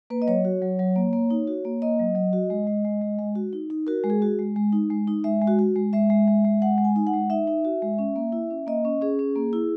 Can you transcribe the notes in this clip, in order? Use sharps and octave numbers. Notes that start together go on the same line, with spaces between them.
A#3 B4
D#5
F#3 C#5
F#4
F#3
F#3
A#3
A#3
D#4
F#4
A#3
A#3 D#5
F#3
F#3
F#4
G#3
G#3
G#3
G#3
G#3
F#4
D#4
D#4
F#4 A#4
G#3
G#4
F#4
G#3
G#3
D#4
G#3
D#4
G#3 E5
G#3
F#4
F#4
G#3
G#3 E5
G#3
G#3
G#3
G#3 F#5
G#3
G#5
D#4
F#5
G#3
D#4 E5
D#4
F#4
G#3
C#4
A#3
E4
C#4
A#3 D#5
C#4
C#4 G#4
C#4
A#3
E4